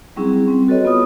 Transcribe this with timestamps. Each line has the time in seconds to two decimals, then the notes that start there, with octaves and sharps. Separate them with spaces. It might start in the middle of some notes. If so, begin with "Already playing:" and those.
0.16 F#3 G3 C4 C#4 E4 G#4
0.47 G3 C4
0.68 F#4 A4 B4 C#5 D#5
0.85 B3 F4 D#6